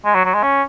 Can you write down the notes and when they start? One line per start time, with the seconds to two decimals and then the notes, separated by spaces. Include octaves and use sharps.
0.05 G#3
0.14 F#3
0.25 F#3
0.34 G#3
0.43 C#4